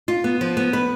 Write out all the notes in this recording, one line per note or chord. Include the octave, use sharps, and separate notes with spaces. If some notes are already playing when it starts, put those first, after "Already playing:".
F4
B3
F3
B3
B4